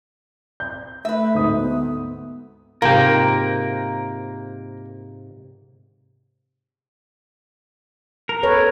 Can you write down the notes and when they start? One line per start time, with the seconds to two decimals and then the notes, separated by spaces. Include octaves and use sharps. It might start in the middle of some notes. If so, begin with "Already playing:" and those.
0.60 G6
1.05 A3 B4 E5
1.35 D2 G#2 D#6
1.56 B3
2.82 G#2 C3 A#3 F4 A#4 G5
8.29 A#4
8.43 A4 B4 C#5